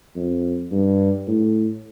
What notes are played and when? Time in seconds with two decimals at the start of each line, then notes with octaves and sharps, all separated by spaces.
0.16 F2
0.72 G2
1.27 A2